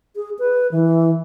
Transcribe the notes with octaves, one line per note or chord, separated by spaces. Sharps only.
G#4
B4
E3